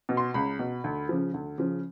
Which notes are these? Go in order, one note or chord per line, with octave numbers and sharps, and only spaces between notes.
B2
C6
C#2 B5
B2
D2
C#3 F3
D2
C#3 F3